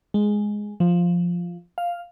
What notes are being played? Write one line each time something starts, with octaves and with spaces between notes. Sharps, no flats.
G#3
F3
F5